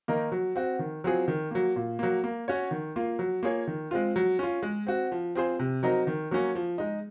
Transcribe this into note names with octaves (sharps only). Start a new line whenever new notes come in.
D#3 A#3 D#4 A#4
F#3
C4 F#4
D#3
F#3 C4 F4 G#4
D#3
F#3 A#3
A#2
F#3 A#3
A#3
C#4 F#4 C#5
D#3
A#3 F4
F#3
A#3 F4 G#4 C#5
D#3
G#3 C4 F4
F#3
C#4 F4
G#3
C4 F#4
F3
C4 F4 G#4 C5
C3
F#3 C4 D#4 A#4
D#3
F#3 A#3 C#4
F3
G#3 D#4